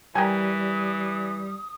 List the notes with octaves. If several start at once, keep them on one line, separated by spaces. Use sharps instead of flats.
E3 G3 A#4 G5 G#5 D#6